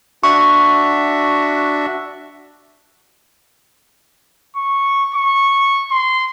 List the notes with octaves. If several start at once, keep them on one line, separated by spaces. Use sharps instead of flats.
D4 F#4 E5 C#6
C#6
C#6
C6